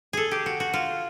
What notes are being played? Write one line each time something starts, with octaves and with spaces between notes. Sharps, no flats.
G#4 A4
G4
F#4
F#4
F4